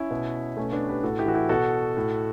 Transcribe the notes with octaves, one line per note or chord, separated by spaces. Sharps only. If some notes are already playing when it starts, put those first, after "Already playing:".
Already playing: C#4 E4
B2
B2 A3 C#4
B3 D4
G4 B4
A2 F#4 A4
E4 G4
E3 F#4
E4 G4
B2 F#4 A4
A2